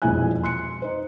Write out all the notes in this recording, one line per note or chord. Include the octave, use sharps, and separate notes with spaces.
E1 B1 F2 E4 G#5 F#6
C6 F#6 C#7
D#4 C5